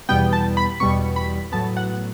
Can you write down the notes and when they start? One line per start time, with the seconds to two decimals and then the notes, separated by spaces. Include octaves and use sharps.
0.09 E2 B2 G3 B3 G5
0.33 A5
0.57 B5
0.80 E2 B2 G3 B3 C#6
1.16 B5
1.52 A2 F#3 B3 A5
1.77 F#5